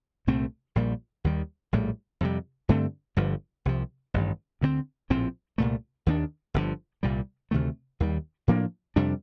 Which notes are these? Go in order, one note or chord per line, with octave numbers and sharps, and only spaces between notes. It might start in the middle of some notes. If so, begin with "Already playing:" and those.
C2 A#2 A3 C4
A#1 A#2 G3
D#2 D#3 G3
A#1 A2 G3
F2 C3 G3
G2 D3 A3 C4
G1 G2 D3 F3
C2 C3 F3
A1 G2 D#3
D2 D3 A3 C4
A#1 A2 F3 C4
C2 A#2 A3
D#2 D#3 A#3 D4
G1 G2 D3 F3
C2 A#2 G3
D2 C3 D#3 A3
D#2 D#3 G3
A2 F3 A#3 D4
F2 C3 G3 D4